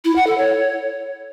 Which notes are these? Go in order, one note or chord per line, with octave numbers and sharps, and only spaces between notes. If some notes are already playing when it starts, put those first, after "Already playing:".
E4
F#5
A4
C#5